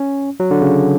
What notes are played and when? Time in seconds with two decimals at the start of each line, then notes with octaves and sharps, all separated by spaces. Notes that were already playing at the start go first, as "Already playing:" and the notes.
Already playing: C#4
0.40 F#3
0.51 D3
0.61 C#3